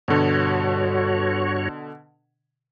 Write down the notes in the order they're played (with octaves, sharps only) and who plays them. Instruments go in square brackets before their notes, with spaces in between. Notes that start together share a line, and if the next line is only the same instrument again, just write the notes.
[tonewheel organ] G2 F#4 C#5 [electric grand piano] B2 D3